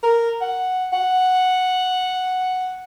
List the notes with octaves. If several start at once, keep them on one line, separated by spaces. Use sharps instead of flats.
A#4
F#5
F#5